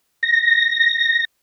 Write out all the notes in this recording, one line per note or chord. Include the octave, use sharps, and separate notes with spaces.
A#6